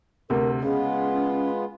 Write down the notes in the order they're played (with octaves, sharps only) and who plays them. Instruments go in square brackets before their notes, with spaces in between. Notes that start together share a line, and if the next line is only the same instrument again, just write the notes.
[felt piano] D2 C3 [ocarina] A#4
[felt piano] C#3 [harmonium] G#3 B3 F4 [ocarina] C#4